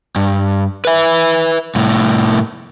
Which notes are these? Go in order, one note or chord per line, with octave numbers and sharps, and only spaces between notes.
G2
B4 E5
C2 A2